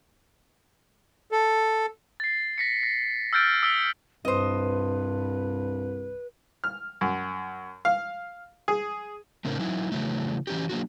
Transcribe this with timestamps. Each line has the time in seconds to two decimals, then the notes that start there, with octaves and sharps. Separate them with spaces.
1.32 A4
2.20 A6 C7
2.58 A#6 B6 C#7
2.83 A#6
3.33 E6 F6 G6 A6 D7
3.62 D#6 E6 B6 D7 G7
4.25 C2 G2 B4 C5 D#5
6.64 F6
7.01 F#2
7.85 F5
8.68 G#4
9.45 A2 C#3 C4 D4 A#4
9.60 F#3 D#4 E4
9.92 C#3 E3 F#3 A3
10.47 E3 F#3 C#4 F#4 G4
10.69 F#3 A#3 C4 D4 F#4